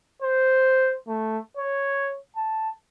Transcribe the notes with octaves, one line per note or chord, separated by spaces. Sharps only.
C5
A3
C#5
A5